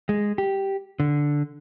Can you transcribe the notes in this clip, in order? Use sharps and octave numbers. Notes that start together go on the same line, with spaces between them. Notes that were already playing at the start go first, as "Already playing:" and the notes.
G#3
G4
D3